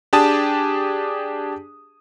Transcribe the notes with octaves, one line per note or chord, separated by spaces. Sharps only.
D4 G4 G#4 A5 D#6